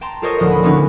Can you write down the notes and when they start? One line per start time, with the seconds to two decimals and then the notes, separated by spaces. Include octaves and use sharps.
0.01 G5 A5 A#5 C6
0.22 F4 A4 A#4 C5 C#5 D#5
0.38 D#1 D2 F3 B3 D#5 D#7
0.50 B5
0.63 D3 F3 A3 B3 C#4 D#4